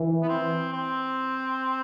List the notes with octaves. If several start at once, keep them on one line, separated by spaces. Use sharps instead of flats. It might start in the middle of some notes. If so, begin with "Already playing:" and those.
Already playing: E3
B3
C4
C4